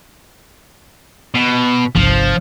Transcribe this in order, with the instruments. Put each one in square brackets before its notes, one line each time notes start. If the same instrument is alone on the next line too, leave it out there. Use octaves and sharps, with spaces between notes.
[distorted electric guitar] B2
[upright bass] G1 C2 [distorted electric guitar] F3